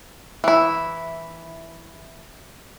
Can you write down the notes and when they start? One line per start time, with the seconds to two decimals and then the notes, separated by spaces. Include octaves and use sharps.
0.44 E3 E4